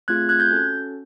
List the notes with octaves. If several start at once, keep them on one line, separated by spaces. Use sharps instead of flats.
A3 C4 F4 G#4 F#6 G#6
F#6 G#6
G6 A6
C#4 F#4 A4